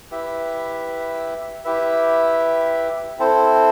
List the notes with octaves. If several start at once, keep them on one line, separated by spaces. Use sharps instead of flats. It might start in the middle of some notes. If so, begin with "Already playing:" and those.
E4 G4 B4 E5
E4 G4 B4 E5
C4 E4 A4 C5